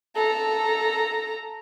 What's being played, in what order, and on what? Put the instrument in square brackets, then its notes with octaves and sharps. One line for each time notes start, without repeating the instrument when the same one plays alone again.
[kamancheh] A4 A#5